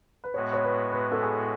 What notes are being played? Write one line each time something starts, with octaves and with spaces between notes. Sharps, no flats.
B4
A2 G#3 B3 F#4 C#5
C#5
B4
B4
A4
G#4